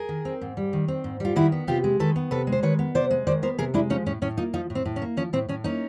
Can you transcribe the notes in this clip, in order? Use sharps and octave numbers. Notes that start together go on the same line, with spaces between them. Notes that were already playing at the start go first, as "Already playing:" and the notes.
Already playing: G#4 A#4
D#3
C4
G#2
G3
D#3
C4
G#2
G3 F4
D#3 E4 F#4
B3
C3 F4 G4
G#3
D#3 A4 B4
B3
C3 A4 B4
G#3
C5
D#3 B4 C#5
B3
C3 C5 D5
G#3
D#3 C5 D5
B3 A#4 C5
C3 G#4 A#4
G#3 D4 E4
F3 C#4 D#4
A2 C#4
A2 C#4
A#3 D#4 F4
F3 D#4 F4
A2
C4
A2
C#4
A#3
F3 C#4
A2 C4
A2 C#4
A#3 C#4 D#4